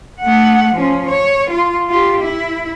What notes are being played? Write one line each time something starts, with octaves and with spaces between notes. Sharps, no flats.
A3 F#5
F3 C#4
C#5
F4
F4 G4
E4